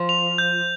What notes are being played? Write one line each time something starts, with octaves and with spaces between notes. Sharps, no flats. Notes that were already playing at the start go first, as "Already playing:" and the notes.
Already playing: F3
F7
G6